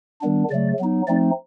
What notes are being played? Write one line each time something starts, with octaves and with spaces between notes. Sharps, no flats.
D#3 G3 B3 D4
C#3 F#3 A3 D5
F#3 B3 D#4
F3 A3 C4 D#4 D5